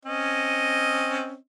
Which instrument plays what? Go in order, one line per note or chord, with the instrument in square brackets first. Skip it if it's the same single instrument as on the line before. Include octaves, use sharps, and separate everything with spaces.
[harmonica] C4 C#4 D#5